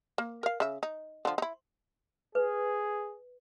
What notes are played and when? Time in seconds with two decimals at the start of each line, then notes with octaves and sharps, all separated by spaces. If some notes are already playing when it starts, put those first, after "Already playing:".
0.18 A#3
0.43 A#4 F5
0.60 C#3 E5
0.83 D#4
1.25 D3 F3
1.38 D#4 E4
2.35 G#4 B4